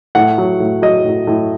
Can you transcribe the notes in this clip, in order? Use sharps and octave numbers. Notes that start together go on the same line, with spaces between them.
A2 F#5
F#3
A2
F#3 D#5
A2
A2